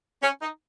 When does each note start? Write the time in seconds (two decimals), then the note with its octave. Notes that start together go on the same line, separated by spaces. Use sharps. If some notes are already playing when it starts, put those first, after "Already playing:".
0.22 C#4
0.42 D#4